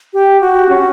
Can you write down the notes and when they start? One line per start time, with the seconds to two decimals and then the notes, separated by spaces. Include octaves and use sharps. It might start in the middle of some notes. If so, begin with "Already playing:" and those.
0.13 G4
0.41 F#4
0.69 C#4